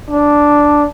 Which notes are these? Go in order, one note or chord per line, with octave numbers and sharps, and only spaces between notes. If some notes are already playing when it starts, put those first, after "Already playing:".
D4